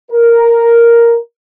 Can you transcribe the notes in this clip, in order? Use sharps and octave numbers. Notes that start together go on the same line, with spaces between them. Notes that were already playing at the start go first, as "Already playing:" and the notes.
A#4